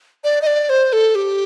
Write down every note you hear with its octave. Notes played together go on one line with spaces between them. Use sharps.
D5
D#5
D5
C5
A4
G4